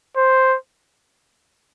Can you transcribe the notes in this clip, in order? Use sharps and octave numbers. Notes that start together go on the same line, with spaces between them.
C5